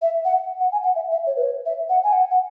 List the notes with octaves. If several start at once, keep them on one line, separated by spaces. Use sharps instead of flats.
E5
F#5
F#5
G#5
F#5
E5
E5
C#5
B4
C#5
E5
F#5
G#5
F#5
F#5